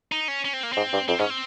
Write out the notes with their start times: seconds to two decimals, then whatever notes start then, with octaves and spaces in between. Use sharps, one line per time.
0.12 D#4
0.28 C#4
0.45 C#4
0.53 C4
0.63 A#3
0.73 G#2 C4
0.93 G2
1.08 F2 C4
1.19 G#2 C#4
1.30 C4